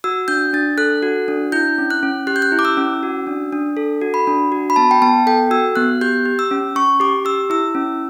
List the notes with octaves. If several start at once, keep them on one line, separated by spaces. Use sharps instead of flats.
F#4 E6
D4 G6
D4 A6
A4 F#6
F#4
D4
E4 G6
C#4
F#6
C#4
G4 F#6
G6
F#6
E4
D6
E6
C#4
F#4
D4
D4
A4
F#4
B5
D4
F#4
B5
B3 A5
G5
B3 A5
A4 G5
F#4 E6
B3 F#6
G4 G6
G4
E6
C#4
C#4 C#6
G4 D6
G4 E6
E4 E6
C#4